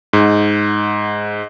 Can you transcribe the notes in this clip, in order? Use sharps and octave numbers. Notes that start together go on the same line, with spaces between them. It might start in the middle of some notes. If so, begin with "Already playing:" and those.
G#2